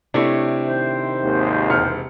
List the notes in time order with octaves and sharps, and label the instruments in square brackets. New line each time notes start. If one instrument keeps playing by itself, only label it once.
[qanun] C3 A3 C#5 [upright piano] D4 E4
[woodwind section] D#3 C5
[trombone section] G#1 D#2
[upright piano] E1 F6 C#7